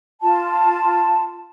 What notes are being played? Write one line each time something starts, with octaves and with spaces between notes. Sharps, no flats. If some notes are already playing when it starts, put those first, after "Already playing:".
F4 A5